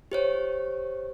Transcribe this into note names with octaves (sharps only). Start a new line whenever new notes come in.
G4 C5 C#5